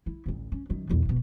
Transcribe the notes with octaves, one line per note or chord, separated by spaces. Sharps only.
E4
A1 D2
C#4
F#2 D#3
B1 E2
D1 B2